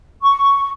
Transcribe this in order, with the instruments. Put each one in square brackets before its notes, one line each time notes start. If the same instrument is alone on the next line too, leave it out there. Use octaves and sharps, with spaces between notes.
[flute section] C#6